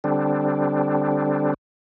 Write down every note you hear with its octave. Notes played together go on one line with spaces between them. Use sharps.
D3 G3 C4 D4